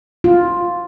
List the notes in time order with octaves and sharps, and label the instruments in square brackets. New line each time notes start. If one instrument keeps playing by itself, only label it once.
[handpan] F4